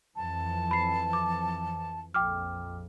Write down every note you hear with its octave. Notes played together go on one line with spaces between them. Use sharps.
F2 E3 F3 A5
B5 C7
D6
A#1 F2 G5 D6 F6